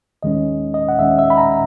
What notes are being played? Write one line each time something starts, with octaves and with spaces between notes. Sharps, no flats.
D#2 D#3 G#3 C#4 D#5
D#5
F#5
D#2 D#3 G#3 C#4 E5
E5
B5
A#5